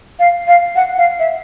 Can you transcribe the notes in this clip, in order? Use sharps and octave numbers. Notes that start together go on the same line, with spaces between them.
F5
F5
F#5
F5
E5